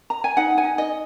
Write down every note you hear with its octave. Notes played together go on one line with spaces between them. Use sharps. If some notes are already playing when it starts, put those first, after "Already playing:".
A#5
G#5
D#4 F#5
G#5
D#4
D#5